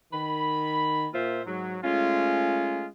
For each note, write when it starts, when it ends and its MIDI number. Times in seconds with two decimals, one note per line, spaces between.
0.13 1.08 51
0.13 1.08 83
1.13 1.41 46
1.13 1.41 58
1.13 1.41 65
1.13 1.41 72
1.13 1.41 76
1.45 1.77 44
1.45 1.77 54
1.83 2.87 56
1.83 2.87 57
1.83 2.87 61
1.83 2.87 65